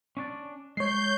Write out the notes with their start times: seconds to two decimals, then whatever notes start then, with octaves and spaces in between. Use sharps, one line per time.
0.17 C#4 D4 D5
0.77 G#3 C#5 G6 C7